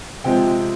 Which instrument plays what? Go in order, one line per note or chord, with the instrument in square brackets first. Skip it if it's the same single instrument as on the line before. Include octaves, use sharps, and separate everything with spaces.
[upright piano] C3 F3 G#3 G5